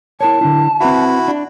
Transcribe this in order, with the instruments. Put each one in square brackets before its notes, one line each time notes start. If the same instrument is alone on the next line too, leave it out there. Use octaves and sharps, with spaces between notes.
[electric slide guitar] E4 A#4 C#5 [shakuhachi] A5
[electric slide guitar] D3 D4 E4
[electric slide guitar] C4 B4 E5 [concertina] E4 F#4
[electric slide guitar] D4